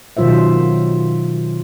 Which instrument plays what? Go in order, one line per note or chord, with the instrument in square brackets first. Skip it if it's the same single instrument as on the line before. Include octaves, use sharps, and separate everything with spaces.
[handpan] B2 D#3 F#3 F4 C5 E5